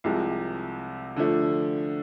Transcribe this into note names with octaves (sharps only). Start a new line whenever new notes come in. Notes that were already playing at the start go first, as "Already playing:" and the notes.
C2 C3 F3 G#3
D3 F3 A3